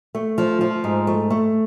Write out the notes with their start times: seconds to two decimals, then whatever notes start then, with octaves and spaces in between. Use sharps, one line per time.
0.15 A3
0.38 F3
0.61 F3
0.84 G#2
1.07 A3
1.30 A3